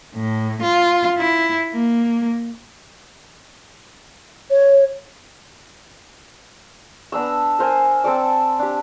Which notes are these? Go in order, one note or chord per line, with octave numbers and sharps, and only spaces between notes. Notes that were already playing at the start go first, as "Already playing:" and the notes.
A2
F4
E4
A#3
C#5
B3 D4 A#5 E6
A#4 C5 G#5
C4 A4 D5
D4 G4